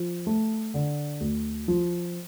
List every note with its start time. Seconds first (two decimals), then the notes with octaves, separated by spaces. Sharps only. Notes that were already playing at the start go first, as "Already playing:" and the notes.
Already playing: F3
0.27 A3
0.74 D3
1.21 D2
1.68 F3